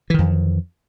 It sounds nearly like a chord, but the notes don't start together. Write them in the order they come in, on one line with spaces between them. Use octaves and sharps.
E3 D#3 F2